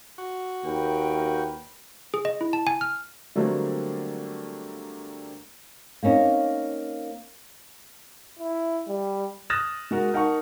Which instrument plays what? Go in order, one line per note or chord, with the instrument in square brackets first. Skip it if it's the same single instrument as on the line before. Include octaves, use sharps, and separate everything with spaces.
[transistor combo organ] F#4
[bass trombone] D#2 [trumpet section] A#4 B4 G5
[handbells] G#4
D#5
E4
A5
G#5
F6
[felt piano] D3 F#3 G3 A3 A#3 C4
[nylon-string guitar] A#3 C4 C#4 D#4
[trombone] E4
G3
[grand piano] D#6 F6 F#6 A6 A#6 E7
G#3 F#4 A#4
D#4 A#4 F#5 A5 C#6